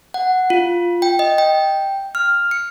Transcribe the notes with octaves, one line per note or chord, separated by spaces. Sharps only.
F#5
F4
G5
D#5
G5
F6
C#7